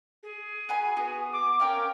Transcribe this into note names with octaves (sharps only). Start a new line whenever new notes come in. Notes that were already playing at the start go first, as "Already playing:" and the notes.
G#4
F#4 G#5 B5
B3 F#4
D6
C#4 A#4 F5 G5